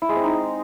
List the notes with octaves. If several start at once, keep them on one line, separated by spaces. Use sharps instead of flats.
E4
G#3
C4
D#4